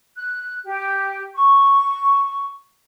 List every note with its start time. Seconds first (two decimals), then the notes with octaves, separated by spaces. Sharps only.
0.15 F#6
0.65 G4
1.34 C#6